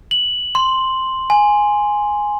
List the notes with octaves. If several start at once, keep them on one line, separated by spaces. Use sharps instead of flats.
F#7
C6
G#5